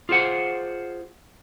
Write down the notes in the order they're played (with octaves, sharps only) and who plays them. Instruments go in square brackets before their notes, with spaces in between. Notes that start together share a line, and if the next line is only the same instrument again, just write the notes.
[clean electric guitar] F4 G#4 C5 F#5